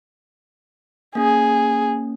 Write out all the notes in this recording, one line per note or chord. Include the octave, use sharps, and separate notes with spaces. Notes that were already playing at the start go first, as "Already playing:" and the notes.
A#3 C#4 G#4